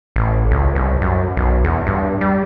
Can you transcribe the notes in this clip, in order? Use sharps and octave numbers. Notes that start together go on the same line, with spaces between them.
A1
C#2
C2
F#2
B1
E2
G2
G3